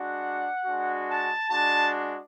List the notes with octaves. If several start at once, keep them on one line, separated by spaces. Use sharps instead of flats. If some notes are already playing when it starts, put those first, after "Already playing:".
Already playing: G#3 D4 F#4 F#5
G#3 D4 F#4
A5
G#3 D4 F#4 A5